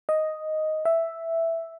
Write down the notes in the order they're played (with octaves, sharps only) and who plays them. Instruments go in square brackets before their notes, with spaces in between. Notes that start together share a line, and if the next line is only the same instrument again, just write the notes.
[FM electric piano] D#5
E5